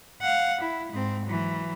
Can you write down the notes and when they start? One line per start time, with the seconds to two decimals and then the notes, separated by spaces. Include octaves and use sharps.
0.22 F5 F#5
0.61 E4
0.92 G#2 C4
1.25 E3 F#3